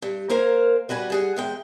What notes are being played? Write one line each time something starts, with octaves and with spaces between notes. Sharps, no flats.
G2
A#3 A#4 C5 F5 G#5
G3 F#4 B4 G#5
G3 G#4 F#5
E2 G#3 G5